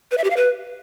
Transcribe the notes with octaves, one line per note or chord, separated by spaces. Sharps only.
B4
E5
G4
F5
B4